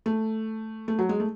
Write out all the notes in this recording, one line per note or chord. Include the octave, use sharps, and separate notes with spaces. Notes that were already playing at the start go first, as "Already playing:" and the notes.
A3
A3
F#3
G#3
A3